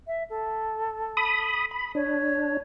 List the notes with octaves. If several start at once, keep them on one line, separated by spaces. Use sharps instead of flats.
E5
A4
B5 D#6
B5
D4 C#5